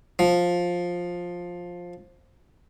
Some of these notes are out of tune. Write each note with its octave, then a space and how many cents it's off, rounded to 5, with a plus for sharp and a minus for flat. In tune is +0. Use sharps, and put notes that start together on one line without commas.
F3 +10